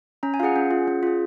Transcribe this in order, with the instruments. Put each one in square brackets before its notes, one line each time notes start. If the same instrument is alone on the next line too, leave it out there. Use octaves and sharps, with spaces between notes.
[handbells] C#4 A#5
G#5
F4 G#4 F5 F#5
C#4
F4 G#4
C#4
F4 G#4